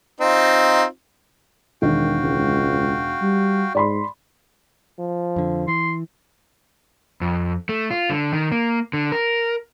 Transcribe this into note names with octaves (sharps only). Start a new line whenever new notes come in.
C4 D#4 F4
E1 D#3 F#4 F5 G5
C#2
G3
G#2 D5 B5 C6
F3
F2 D3
E3 C6
F2
A3
F4
D3
D#3
A#3
D3
A#4